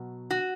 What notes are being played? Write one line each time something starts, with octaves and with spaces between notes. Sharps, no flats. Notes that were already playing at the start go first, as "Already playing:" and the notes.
Already playing: B2 F#3
F#4